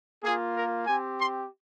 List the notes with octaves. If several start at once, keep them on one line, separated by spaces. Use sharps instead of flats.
A#3 F4 G#4
A#4
C4 G4 G#5
C6